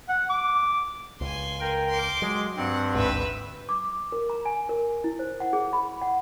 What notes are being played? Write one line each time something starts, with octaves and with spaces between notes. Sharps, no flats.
F#5
D6
C#2 G#5 C6
A#4 G5
C6 D6
F#3 G#3
G2 C4 F#5
G#1 D2 G#2 B4 E5
D6
A#4
A#5
G#5
A#4
E4
C5
F#5
G#4
B5
F#5